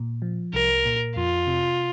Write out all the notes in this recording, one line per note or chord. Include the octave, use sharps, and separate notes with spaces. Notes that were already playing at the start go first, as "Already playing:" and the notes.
Already playing: A#2
F3
C2 A#4
A#2
F2 F4
C3